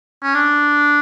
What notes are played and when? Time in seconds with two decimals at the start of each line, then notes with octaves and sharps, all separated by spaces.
0.23 C#4
0.35 D4